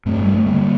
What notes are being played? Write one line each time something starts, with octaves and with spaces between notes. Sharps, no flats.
G2 A3 C4
G3
A3
D3 G3 A#3